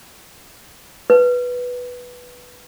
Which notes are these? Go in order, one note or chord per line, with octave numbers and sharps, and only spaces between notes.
B4